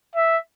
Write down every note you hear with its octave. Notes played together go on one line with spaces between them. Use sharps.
E5